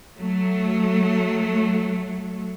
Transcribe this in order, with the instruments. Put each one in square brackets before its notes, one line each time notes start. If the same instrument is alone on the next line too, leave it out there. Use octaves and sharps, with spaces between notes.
[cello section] F#3 A3